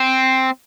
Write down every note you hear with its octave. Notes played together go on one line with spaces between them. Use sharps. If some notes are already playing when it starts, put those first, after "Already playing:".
Already playing: C4